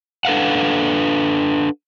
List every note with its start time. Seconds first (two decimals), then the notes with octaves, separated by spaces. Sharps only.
0.25 D4 A4 B4 F5 F#5